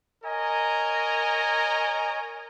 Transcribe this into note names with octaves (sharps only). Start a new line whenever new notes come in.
A#4 C#5 D#5 G#5 A#5